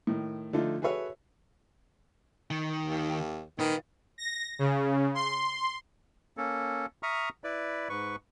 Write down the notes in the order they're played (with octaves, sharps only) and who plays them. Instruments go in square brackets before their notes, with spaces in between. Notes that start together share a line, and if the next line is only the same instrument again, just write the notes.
[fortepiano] A2 D#3
D3 F3 A3 D#4 F4
F#4 G#4 A4 B4 C#5 E5
[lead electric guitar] D#3
[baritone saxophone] D#2
[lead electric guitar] A#2 B4 [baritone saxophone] D#3
[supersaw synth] A#6
C#3
C6
[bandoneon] A#3 C#4 A4
E5 A#5 C#6 D#6 F6
E4 B4 D5
G#2 B4 C#6